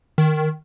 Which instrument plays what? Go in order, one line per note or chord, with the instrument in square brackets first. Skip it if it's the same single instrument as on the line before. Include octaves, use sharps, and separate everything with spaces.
[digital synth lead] D#3